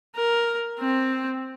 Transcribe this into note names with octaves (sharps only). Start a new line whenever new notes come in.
A#4
C4